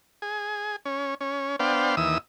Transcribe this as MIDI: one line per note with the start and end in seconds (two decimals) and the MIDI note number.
0.22 0.76 68
0.85 1.15 61
1.21 1.56 61
1.59 1.95 59
1.59 1.95 62
1.59 1.95 72
1.59 1.95 77
1.59 1.95 79
1.97 2.18 39
1.97 2.18 52
1.97 2.18 87
1.97 2.18 88